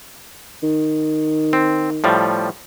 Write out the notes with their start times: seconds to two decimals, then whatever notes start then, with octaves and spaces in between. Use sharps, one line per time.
0.63 D#3
1.53 C4
2.04 A2 F3 G3